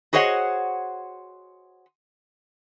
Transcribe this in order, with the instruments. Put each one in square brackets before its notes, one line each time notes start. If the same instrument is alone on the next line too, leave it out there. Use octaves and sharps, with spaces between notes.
[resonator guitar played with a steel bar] F#4 G#4 C5 C#5 D#5 F#5